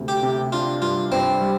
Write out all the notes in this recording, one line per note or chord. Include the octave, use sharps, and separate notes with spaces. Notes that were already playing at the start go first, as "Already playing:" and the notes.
Already playing: D2 C3
G4
C3
D4 F4
G2 F4
G2 C4
G3